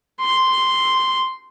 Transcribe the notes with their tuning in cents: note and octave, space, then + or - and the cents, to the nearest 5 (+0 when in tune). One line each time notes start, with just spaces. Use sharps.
C6 -5